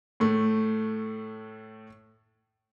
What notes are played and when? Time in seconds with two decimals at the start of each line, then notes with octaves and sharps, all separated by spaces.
0.20 A2 A3